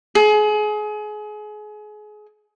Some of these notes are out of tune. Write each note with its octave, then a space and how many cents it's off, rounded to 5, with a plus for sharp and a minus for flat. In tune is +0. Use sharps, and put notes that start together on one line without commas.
G#4 +30